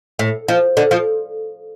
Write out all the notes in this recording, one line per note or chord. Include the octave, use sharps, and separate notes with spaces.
A2
F3
D3
F3